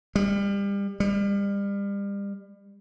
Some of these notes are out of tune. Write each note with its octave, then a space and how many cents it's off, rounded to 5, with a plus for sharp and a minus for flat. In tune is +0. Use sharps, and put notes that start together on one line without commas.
G3 +35
G3 +35